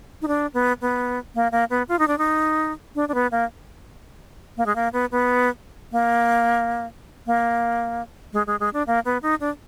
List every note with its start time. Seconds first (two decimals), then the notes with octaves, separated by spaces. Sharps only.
0.22 D#4
0.28 D4
0.54 B3
0.81 B3
1.35 A#3
1.52 A#3
1.70 B3
1.88 F4
1.99 D#4
2.08 D4
2.18 D#4
2.95 D4
3.09 D4
3.14 B3
3.32 A#3
4.57 A#3
4.66 G#3
4.76 A#3
4.93 B3
5.11 B3
5.92 A#3
7.26 A#3
8.33 G#3
8.47 G#3
8.60 G#3
8.73 D4
8.87 A#3
9.05 B3
9.22 D#4
9.40 D4